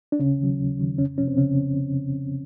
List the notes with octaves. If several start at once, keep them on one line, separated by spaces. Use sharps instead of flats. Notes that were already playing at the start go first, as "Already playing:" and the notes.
D4
D#2 C#3 C#4
D#3 F#3
D#2
D#3 F#3
F2 C#3 C#4
C3 F3 C#4
C4
C#3 C#4